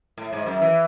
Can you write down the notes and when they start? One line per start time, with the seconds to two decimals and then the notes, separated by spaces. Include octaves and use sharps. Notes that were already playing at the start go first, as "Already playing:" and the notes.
0.18 A2
0.33 G#2
0.46 F#2
0.61 E3